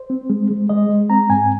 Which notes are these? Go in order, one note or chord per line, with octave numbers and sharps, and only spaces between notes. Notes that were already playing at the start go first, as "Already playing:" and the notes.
Already playing: C5
C4
G#3
G#3
G#3 D#5
G#3
C4 A#5
G#2 G#5